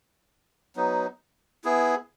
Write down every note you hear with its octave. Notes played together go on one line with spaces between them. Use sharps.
F#3 B3 D#4
B3 E4 G#4